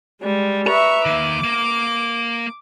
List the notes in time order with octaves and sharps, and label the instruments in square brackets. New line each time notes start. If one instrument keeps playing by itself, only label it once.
[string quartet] G3 G#3
[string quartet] B4 E5 C#6 [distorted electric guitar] A#5
[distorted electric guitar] D#3 A#3 [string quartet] D6
[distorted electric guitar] A#3